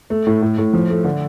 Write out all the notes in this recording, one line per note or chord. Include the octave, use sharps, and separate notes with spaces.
A3
A2
A2
A2
F3
A3
D3